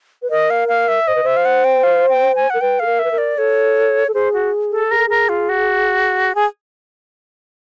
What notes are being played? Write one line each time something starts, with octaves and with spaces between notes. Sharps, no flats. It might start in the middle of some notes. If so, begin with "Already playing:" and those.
B4
A#4 D#5
F5
F5
E5
C5 D#5
B4
C5 E5
F5
F#5
G5
F5
G5
G#5
A#4 F#5
B4 G5
A4 F5
A#4
B4 E5
A#4
D5
A4 C#5
A4
G#4 C5
F#4
A4
G#4 A#4
A4
G#4 A#4
F4
F#4
G#4